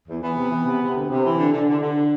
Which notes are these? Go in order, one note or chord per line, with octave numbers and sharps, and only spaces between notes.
E2
E3 B3
C3
E3
C3
C3
D2
C3
E3
D3
D3
D3
D3